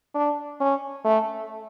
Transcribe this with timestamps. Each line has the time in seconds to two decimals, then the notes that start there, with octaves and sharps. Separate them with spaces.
0.15 D4
0.60 C#4
1.05 A3